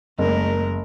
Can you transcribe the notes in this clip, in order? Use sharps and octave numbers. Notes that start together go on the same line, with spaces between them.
F#1 G#3 A3 A#4